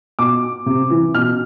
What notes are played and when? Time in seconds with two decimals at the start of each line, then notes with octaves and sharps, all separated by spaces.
0.19 B2 D6
0.66 C3
0.90 E3
1.14 B2 F6